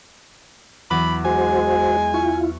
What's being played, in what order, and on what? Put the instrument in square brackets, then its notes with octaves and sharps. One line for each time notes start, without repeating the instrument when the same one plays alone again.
[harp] E2 F#3 D6 [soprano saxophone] B5
[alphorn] G#3 [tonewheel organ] F#4 C5 [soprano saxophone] G#5
[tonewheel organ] E4 F4 [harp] C#6